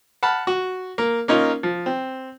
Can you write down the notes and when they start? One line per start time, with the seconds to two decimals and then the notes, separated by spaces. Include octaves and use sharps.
0.23 F#5 A5 B5 F6
0.47 F#4
0.98 A#3
1.28 A#3 C#4 D#4 F4
1.63 F3
1.86 C4